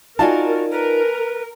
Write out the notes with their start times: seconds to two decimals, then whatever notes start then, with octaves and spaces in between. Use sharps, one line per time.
0.19 D#4 F4 F#4 A#4 D5 G#5 A5
0.71 A#4 B4